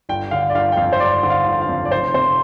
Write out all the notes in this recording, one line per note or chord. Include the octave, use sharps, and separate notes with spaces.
G1 G5
D3 F5
D5
G1 F5
G5
F2 F5
C5
G1 D5
D3
F5
G1
F5
F2
D5
F1 C5
C3 C5